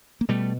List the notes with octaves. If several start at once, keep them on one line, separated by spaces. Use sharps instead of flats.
A#3
B2 G3 A3